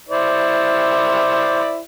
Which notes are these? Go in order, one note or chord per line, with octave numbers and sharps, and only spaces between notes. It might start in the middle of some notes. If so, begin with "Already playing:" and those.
E4 C5 D5